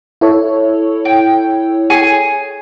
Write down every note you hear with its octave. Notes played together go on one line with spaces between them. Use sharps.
E4 A4 C#5
G5
G#4 G#5 C#6